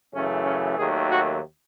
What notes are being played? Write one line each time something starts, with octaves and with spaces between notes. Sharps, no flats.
F#2 C#3 E3 A3 C#4
C#4
D#2 D#3 F#3 A3 G#4
F#4